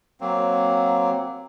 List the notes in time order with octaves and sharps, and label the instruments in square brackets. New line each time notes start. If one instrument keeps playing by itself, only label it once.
[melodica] F#3 A#3 C4